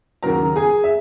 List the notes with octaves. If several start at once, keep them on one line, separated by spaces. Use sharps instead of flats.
D#2 C#3 F#3 A#4 A#5
G#4 G#5
E5